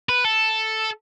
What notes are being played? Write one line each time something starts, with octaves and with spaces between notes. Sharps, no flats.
B4
A4